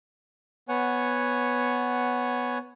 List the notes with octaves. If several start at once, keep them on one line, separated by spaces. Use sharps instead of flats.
B3 C#5 F#5 G#5